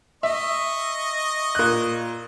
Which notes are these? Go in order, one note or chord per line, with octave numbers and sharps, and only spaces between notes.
D#5 E5 C#6
A#2 F#6